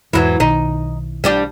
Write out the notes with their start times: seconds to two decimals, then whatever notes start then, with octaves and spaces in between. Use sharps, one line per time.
0.13 E2 G#2 E3 F#3 E4
0.40 B1 D#3 D#4
1.24 G3 D4 G4